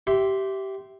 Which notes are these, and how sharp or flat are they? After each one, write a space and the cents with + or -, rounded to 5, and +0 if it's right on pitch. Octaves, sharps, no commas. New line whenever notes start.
G4 -20 E5 +0 C6 +0